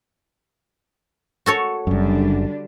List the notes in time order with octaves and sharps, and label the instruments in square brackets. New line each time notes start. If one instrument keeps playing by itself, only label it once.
[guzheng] F#4 A4 C#5
[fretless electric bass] F#1 F#2 [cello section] D3 G3 D4